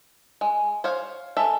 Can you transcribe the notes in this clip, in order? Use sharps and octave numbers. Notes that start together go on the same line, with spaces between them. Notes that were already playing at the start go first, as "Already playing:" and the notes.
G#3
C5 C#5 F5
G#3 A4 E5